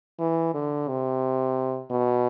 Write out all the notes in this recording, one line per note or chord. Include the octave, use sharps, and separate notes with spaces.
E3
D3
C3
B2